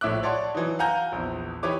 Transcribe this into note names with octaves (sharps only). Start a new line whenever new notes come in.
A#1 A2 E5 D6 F#6
C#5 D5 F#5 A5 C6
E3 F#3 D#4
F5 F#5 G#5 A#5 G6
A#1 E2
E3 D#4 G4 B4 C#5 D6